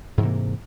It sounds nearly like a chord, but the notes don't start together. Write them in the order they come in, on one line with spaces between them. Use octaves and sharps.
G#2 E3 C3 A#3